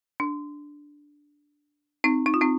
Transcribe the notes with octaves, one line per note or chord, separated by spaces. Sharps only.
D4
C4 D#4
D#4
F4
C4 D#4